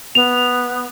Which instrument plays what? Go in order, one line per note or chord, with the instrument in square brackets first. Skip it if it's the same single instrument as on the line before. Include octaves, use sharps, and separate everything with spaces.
[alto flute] B3 [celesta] F7